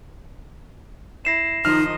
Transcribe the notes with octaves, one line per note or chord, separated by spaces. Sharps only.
E4 A#6 C7 E7
D#3 F3 D#4 D#5 F6